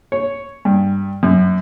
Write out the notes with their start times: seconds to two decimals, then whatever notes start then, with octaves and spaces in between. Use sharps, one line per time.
0.12 C#5
0.65 G2
1.23 F#2